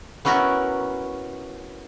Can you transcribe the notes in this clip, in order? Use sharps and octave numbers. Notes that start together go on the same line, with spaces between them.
B3 C#4 E4 F#4 A#4